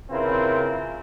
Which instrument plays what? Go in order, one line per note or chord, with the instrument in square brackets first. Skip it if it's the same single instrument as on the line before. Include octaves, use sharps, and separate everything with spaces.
[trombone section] C#3 C4 E4 F4 A#4 B4